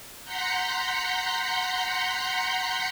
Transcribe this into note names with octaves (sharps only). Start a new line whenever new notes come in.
F#5 A#5 C6 G6 B6 C#7